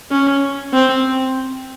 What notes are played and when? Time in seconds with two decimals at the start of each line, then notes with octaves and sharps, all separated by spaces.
0.11 C#4
0.73 C4